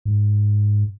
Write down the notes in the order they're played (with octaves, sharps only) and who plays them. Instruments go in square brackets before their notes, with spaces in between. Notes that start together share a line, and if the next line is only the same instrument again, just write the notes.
[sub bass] G#2